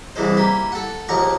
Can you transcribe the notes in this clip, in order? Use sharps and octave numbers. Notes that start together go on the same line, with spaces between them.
C2 E3 G#3 C5
A#3 E4 G4
A4 F#5
A#1 D#2 A#4 F#5 C#6